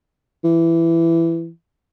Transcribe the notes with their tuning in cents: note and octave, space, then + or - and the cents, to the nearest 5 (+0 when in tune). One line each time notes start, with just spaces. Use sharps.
E3 +15